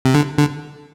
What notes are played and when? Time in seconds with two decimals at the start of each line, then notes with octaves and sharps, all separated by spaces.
0.05 C3
0.15 D3
0.38 D3